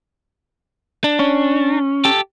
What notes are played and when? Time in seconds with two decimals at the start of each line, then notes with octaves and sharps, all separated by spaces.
1.04 D4
1.19 C#4
2.05 G4 A4